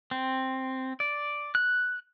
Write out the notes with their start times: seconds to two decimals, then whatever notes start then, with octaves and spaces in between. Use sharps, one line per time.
0.11 C4
1.00 D5
1.55 F#6